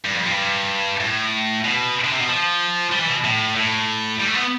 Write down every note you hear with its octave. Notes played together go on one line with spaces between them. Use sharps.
G2
F2
G2
A2
B2
D3
C3
B2
F3
G3
E3
B2
A2
A2
G3
A3
B3